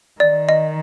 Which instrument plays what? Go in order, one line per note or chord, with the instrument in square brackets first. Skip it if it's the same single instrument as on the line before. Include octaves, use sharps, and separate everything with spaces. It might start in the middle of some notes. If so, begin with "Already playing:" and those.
[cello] D#3 [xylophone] D5
[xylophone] D#5